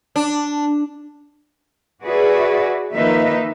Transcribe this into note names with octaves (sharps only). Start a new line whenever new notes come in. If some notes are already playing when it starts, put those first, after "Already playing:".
D4
F#4 G#4 B4 D5 E5
D#3 F3 A#3 D#4 B4 E5